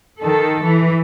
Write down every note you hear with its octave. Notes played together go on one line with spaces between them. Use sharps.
D#3 A4
E3